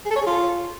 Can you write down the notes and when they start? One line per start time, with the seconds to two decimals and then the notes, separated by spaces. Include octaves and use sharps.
0.05 G#4
0.11 A4
0.16 C#5
0.21 G#4
0.26 F4